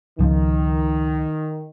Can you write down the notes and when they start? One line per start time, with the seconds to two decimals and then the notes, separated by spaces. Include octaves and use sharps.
0.19 C#2 D#3 F3